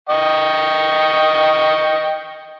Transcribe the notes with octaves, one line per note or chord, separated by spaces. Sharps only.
D#5 G5 C#6